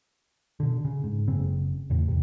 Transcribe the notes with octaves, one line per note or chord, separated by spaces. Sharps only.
B2 D3
C#3
G#2
F#1 C#3 C4
E2 A2 C#3
E2 C3